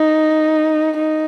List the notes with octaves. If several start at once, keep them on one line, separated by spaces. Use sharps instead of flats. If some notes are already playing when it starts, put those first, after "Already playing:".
Already playing: D#4
D#4